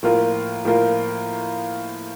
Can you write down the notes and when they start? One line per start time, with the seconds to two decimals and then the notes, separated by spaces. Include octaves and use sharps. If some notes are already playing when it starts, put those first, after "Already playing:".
0.03 A2 F3 A#3 F4 A#4
0.65 A2 F3 A#3 F4 A#4